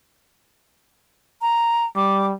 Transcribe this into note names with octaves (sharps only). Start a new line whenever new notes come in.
A#5
G3 D6